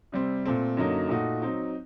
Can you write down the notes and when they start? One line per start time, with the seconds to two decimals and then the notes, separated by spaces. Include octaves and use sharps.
0.12 C3 G3 C4
0.46 A#2 A3 C4
0.77 F#2 D3 F#3 A#3 D#4
1.09 A#2 A3 D#4 F#4
1.42 F#3 C4 D#4